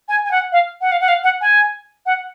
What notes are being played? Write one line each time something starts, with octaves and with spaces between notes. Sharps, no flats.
G#5
G#5
F#5
F5
F#5
F5
F#5
F5
F#5
G#5
F#5